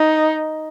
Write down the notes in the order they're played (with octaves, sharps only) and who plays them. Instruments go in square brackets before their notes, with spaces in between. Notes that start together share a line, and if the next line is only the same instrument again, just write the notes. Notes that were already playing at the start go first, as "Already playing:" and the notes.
Already playing: [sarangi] D#4